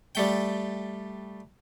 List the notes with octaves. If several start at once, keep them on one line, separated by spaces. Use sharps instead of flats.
G3 A3 G5